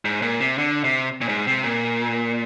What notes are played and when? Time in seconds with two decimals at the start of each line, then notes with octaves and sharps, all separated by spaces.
0.05 G#2
0.22 A#2
0.40 C3
0.58 D3
0.84 C3
1.21 A#2
1.29 G#2
1.47 C3
1.63 A#2